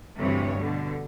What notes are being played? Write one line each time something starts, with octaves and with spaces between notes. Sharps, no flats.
D2 G2 C3 E3 C#5
B2 D3